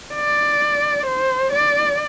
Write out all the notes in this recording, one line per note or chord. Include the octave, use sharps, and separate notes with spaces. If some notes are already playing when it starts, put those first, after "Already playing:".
D5
C5
D5